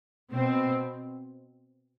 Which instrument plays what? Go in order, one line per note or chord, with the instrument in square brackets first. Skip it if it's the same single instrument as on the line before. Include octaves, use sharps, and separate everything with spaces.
[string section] B2 C4